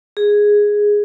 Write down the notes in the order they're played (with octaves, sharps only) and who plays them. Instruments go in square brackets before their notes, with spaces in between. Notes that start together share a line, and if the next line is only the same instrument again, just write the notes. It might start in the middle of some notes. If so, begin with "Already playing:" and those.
[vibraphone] G#4